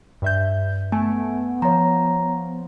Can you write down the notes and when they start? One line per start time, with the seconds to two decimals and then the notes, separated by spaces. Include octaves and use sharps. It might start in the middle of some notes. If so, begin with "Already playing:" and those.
0.22 G2 E5 G6
0.92 A3 B3 G#5
1.62 F3 C#5 A#5